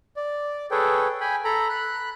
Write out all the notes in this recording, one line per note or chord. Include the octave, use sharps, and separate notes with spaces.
D5
G#4 A4 B4 C#5 G5
G5 G#5 B5
A4 A#5 B5
B5 F#6